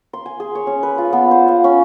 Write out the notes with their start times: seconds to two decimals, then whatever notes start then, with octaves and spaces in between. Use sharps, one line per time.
0.13 C6
0.26 G#5
0.40 G#4
0.55 C#5
0.67 C#4
0.83 B4
0.98 F4
1.13 B3
1.31 C5
1.48 F5
1.64 C#4